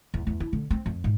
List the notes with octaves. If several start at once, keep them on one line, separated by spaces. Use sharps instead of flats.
E2
E2
E4
D3
C4
F2
G#2